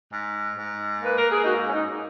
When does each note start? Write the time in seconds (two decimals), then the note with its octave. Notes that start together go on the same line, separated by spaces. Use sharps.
0.12 G#2
0.56 G#2
0.99 A#3 B4
1.17 A#4
1.30 G#4
1.43 G#2 D#4 F#4
1.67 C#4
1.73 D#4